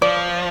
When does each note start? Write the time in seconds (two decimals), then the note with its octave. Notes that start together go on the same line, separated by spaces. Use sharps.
0.02 F3 D5